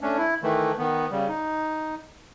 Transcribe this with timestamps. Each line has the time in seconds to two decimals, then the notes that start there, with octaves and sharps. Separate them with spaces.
0.01 A3 C#4 D4
0.18 E4
0.43 D#3 E3 A3
0.78 D#3 B3
1.11 C#3 G3
1.28 D#4